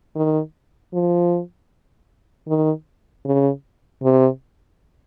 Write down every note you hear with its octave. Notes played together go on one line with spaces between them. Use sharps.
D#3
F3
D#3
C#3
C3